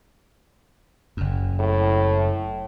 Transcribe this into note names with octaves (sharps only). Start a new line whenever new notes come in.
F#1 F#2
A2